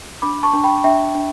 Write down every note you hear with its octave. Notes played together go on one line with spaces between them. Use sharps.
D4 B5 D6
A5 C#6
D4
G5 B5
D4 E5 G5
D4